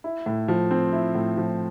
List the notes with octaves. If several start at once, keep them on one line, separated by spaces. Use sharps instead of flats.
E4
A2
F3
C4
E4
A2
F3